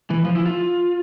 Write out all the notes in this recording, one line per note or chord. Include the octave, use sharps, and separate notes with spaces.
E3
F3
E4
F4